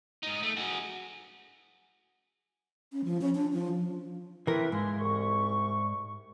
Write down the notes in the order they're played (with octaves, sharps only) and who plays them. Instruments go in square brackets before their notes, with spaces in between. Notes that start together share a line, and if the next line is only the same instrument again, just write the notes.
[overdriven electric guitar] G#2 D#4
A3
F#4 G#4
[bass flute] C#4
F3
C#4
D4
F3
[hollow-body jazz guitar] E3 A#4 [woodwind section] A3 C4 B4
[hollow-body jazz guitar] G#2 [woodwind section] F5 G#5 C6
[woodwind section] C2 C#6